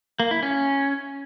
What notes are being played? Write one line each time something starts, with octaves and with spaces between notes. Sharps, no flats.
A#3
E4
C#4